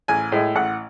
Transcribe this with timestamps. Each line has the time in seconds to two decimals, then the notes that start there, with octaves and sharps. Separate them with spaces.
0.08 A1 G#5
0.32 A2 G#3
0.55 A1 F#5